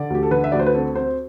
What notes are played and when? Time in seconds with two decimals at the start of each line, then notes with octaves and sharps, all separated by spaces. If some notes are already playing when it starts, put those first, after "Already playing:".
Already playing: D3 D5
0.10 D2 G4
0.23 A4
0.31 D3 B4
0.44 E5
0.52 D2 D5
0.59 C5
0.66 B4
0.74 C4 A4
0.95 C4 C5